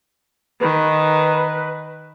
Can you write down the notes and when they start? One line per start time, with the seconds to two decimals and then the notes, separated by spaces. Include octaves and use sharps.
0.61 D#3 B4